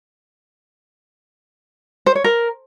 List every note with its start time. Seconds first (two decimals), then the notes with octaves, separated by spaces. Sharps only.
2.06 C5
2.15 C#5
2.24 A#4